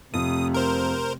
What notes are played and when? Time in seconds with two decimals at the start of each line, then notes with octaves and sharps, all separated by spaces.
0.14 F2 C3 A3 D#6
0.54 A#4 C5